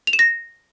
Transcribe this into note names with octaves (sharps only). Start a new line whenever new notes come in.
F7
E7
A#6